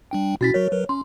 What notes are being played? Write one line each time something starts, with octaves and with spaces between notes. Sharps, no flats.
G3 D4 G5
B2 C#4 E4 F#4 A6 B6
F#3 F#4 A#4 C#5
F#3 A#4 B4
C#4 C6